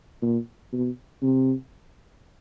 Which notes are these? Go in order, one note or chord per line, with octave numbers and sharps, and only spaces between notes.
A#2
B2
C3